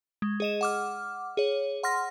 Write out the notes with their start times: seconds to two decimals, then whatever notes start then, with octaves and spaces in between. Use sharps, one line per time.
0.22 G#3
0.40 G#4 D#5 E7
0.61 F#5 D6 F6
1.37 G#4 C#5
1.83 F#5 C6 F6 A#6